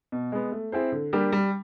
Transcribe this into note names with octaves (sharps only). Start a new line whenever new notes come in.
B2
G#3 B3
A3
C4 E4 G#4 C5
D3
G3 A#3 D4 G4
G3